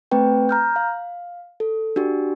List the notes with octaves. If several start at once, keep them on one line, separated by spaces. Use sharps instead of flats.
A3 C4 B4 G5
A#5 F6 G6
F5
A4
D4 F#4 G4